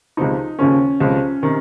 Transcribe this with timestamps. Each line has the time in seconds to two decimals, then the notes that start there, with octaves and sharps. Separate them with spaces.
0.17 C#2 C3 F3 D#4
0.59 D#2 C#3 F3 C#4
1.00 C#2 C3 F3
1.43 C3 D#3